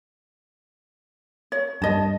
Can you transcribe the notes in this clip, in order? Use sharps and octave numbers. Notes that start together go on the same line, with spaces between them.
C#5
G2 D#5 A5